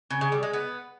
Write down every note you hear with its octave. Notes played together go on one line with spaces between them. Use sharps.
C#3
C#3
G3
G#3
B3